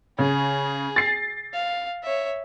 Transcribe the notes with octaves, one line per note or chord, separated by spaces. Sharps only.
C#3 G#4
A6 C7
F5
C#5 E5